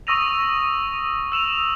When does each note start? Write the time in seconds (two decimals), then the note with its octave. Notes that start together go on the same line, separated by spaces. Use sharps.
0.07 C#6 D#6 E6 A#6 D#7 F7
1.32 E6 E7 F7